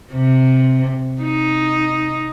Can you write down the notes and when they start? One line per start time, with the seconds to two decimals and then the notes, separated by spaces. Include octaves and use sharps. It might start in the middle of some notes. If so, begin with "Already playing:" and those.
0.13 C3
1.22 D#4